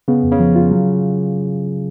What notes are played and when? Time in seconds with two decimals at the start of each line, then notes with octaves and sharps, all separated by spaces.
0.08 C#3 B3
0.24 F2
0.32 C#3
0.40 F3
0.56 F4
0.71 F#3